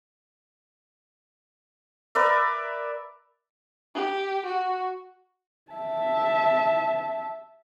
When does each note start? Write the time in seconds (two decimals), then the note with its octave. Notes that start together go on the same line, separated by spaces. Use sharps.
2.15 A#4 B4 D5 E5
3.94 G4
4.46 F#4
5.72 E5 A5